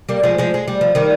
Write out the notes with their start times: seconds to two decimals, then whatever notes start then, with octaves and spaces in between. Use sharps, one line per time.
0.09 G3 A#3
0.23 F3 G#3
0.38 F3 G#3
0.54 G#3
0.68 G3
0.81 F3
0.95 D#3 G3